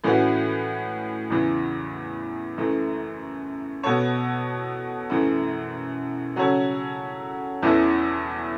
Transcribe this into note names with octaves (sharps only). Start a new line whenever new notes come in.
A2 E3 C#4 F#4 B4
E2 C#3 E3
F#2 E3 A3
B2 B3 A4 C#5
F#2 E3 A3
C#3 F#3 C#4 A4 C#5
E2 E3 C#4 E4 A4